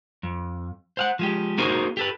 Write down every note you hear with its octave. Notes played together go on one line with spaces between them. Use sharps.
F2
C5 F5 F#5
F3 G#3 G4
A#3 D#4 F#4 G#4 A#4 C5
G4 A4 B4